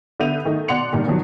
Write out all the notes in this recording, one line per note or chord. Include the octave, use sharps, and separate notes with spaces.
D3 B3 E5 G6 D#7 F7
D#3 A3 D#4
B2 D5 F#5 C6 C#7 F7
G2 A#2 D#3
B2 D#3 F3 F#3